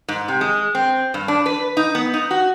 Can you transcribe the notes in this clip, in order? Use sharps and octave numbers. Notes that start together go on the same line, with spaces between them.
G#2
C3
G#3
C4
G2
D4
B4
D#4
B3
D#4
F#4